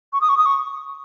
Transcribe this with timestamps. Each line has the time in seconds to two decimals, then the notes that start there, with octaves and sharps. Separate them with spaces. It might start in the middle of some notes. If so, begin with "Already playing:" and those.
0.13 C#6
0.21 D#6
0.29 C#6
0.38 D#6
0.46 C#6